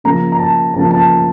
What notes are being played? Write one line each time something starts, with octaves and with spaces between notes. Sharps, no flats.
C#3 F3 A#3 A#5
A#5
A5
C#3 F3 A#3 A5
A5